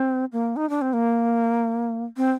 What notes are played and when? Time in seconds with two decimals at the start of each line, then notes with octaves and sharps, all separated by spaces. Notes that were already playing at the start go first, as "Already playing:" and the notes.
Already playing: C4
0.32 A#3
0.56 D#4
0.70 D4
0.82 C4
0.93 A#3
2.17 C4